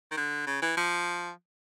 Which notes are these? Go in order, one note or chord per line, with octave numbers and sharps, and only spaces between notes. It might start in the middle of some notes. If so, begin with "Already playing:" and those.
D#3
D3
C#3
E3
F3